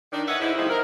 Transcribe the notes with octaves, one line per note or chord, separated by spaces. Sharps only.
D#3 D4
B4 C#5 D#5 E5 F#5
G#2 D3 D#4 E4
F3 G3 A3 C4 D#4 E4
A#4